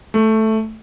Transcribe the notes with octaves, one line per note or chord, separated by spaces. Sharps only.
A3